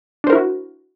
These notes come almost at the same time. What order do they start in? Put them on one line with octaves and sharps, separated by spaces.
D4 C5 A#4 E4 F#4